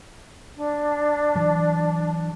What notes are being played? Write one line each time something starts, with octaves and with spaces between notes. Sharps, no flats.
D4
E3 F#3